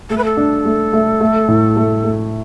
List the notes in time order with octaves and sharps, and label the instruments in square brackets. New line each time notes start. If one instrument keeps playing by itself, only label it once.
[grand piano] A3 [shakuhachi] A4
[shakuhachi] B4
A4
[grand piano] D4
A3
A3
A3
A2
A3
A3